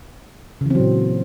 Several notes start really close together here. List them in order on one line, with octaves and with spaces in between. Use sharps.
C#3 E3 C4 F#3 A#2